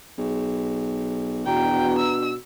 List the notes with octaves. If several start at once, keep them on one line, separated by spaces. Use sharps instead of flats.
B1 G#4
E2 B2 D4 F#4 G5 A#5
E6